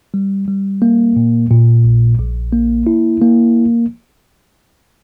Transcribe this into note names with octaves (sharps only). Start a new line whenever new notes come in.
G3
G3
A#3
A#2
A#2
A#1
A#1
A#3
E4
A#3